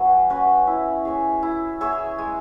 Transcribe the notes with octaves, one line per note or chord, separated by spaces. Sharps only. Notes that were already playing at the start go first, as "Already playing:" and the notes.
Already playing: F#3 C#4 B4
C#4 F#4 B4
E4
G#4 C#5 E5
E4
G#4 C#5 E5
G#3